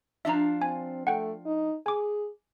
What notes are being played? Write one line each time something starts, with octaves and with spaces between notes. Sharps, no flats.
F3 D4 F4 E5 A#5
C4 G#5
A3 F#5 G5
D#4
G#4 G#5 D6